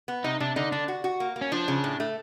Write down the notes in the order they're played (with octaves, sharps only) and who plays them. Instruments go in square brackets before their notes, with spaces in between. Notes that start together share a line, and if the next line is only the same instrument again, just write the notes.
[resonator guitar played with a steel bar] B3
[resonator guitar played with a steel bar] C3 [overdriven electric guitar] D#4
[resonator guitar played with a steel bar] C3 [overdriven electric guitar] D4
[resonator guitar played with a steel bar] D3 [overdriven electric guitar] D#4
[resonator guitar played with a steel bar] D3 [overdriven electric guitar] D4
[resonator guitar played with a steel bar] F#4
F#4
A#3
A#3
[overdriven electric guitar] C#4
[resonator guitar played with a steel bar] F3 [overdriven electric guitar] D4
[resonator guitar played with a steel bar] C#3
A2
A3